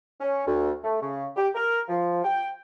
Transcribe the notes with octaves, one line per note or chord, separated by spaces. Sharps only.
C#4
D2
A3
C#3
G4
A#4
F3
G5